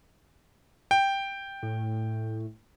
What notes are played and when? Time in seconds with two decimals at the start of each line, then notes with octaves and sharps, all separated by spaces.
0.91 G5
1.63 A2